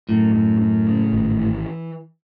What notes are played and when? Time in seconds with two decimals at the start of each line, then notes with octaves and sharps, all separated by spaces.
0.09 F#2 A2
0.35 F#2
0.61 F#2
0.87 C#3
1.12 G#1
1.39 E3